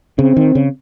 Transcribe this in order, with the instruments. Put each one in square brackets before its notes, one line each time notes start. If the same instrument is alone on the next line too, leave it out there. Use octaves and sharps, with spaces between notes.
[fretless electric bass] C#3 [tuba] C4
[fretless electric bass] D#3
C#3